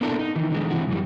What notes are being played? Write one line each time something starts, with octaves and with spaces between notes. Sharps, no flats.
A#3 B3 D4 E4 A4 A#4
D#4
D#3 E3
D3 E3 G#3
C3 E3 E4 F#4
F#2 E3 G3